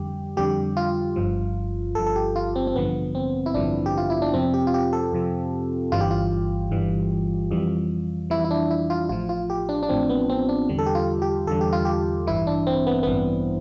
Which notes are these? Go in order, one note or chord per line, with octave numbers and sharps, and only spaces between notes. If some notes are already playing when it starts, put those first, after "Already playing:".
Already playing: F2 D3 G3 G4
F2 D3 G3 G4
F4
G1 G2 F3
G1 G2 F3 A4
A4
G4
F4
C4
C4
A1 G2 D3 F3 B3
C4
E4
A1 G2 D3 F3 D4
G4
F4
E4
D4
F2 C3 F3 C4
G4
F4
G4
A4
F2 C3 F3
G1 G2 E3 G3 F4
G4
F4
G1 G2 E3 G3
F2 E3 G3
F2 E3 G3 E4
E4
D4
E4
F4
A1 A2 F3 F4
F4
G4
D4
D4
A1 A2 F3 C4
B3
C4
D4
E2 D3 G3
A4
G4
F4
G4
E2 D3 G3 A4
G4
F4
G4
A1 G2 E3 E4
D4
C4
B3
A1 G2 E3 B3